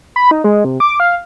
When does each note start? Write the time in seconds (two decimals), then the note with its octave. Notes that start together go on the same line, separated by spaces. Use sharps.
0.16 B5
0.31 D#4
0.44 G#3
0.65 C3
0.80 D6
1.00 F5